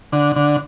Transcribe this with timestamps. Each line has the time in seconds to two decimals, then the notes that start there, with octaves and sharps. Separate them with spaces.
0.13 D3
0.36 D3